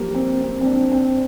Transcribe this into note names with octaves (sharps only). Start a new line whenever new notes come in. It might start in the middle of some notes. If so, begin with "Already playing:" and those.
Already playing: F3 G3 A#3
C4
C4
C4
D4
C4